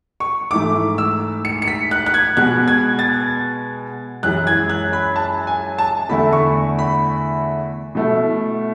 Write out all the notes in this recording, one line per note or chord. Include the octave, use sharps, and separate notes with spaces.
C#6
G#2 E3 A3 D6
E6
C#7
C#7
B6
F#6
F#6
G#6
B2 G#3 B3 F#6
G#6
A6
F#2 E3 G#3 F#6
G#6
F#6
B5
A5
G#5
A5
E2 D3 A3 E4 B5
C#6
B5
B2 A3 E4